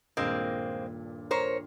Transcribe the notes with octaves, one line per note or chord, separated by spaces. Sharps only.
D#1 G2 A#2 G#3 A#3 C4
A#4 C5 C#5